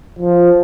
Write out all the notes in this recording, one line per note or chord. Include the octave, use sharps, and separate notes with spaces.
F3